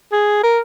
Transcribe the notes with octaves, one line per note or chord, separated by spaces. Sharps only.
G#4
A#4